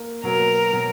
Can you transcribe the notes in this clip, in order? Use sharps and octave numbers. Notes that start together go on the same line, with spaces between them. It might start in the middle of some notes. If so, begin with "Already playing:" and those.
Already playing: A#3
B2 F#3 A#3 A#4
B2 F#3